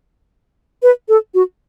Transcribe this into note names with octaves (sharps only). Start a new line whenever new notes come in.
B4
A4
F#4